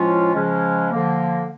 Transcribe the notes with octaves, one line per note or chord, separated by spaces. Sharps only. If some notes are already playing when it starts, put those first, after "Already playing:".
Already playing: A2 F3 G#3 C#4 F4
C#3 F3 G#3 C#4
D3 F3 A#3